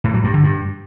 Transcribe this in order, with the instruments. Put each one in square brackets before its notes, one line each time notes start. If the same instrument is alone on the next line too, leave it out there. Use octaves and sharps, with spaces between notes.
[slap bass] A2
F#3
G2
D3
G2